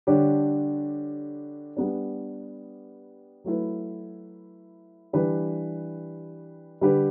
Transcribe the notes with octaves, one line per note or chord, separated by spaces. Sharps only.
D3 G3 D4 G4 C#5
G3 B3 D4
F#3 A3 E4 B4
E3 G3 D4 G4 B4
D3 G3 D4 G4 B4